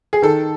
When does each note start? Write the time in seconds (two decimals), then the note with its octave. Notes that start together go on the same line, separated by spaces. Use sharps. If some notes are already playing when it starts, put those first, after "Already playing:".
0.13 G#4
0.22 D#3 A4